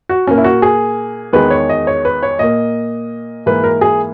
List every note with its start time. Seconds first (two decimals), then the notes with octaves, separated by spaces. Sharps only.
0.09 F#4
0.27 A#2 A#3 C#4
0.38 E4
0.44 F#4
0.62 G#4
1.33 E2 D#3 G#3 B4
1.50 C#5
1.69 D#5
1.87 C#5
2.05 B4
2.23 C#5
2.39 A#2 A#3 D#5
3.46 G#2 E3 A#3 B4
3.64 A#4
3.81 G#4